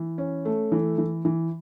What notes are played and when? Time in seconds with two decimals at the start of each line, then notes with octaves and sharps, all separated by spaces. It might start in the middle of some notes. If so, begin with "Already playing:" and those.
Already playing: E3
0.18 C#4
0.45 A3
0.72 E3
0.98 E3
1.25 E3